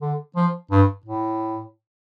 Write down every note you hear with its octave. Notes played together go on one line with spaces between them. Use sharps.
D3
F3
G2
A2